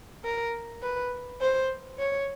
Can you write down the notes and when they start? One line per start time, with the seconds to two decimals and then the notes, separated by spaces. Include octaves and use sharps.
0.25 A#4
0.82 B4
1.41 C5
1.99 C#5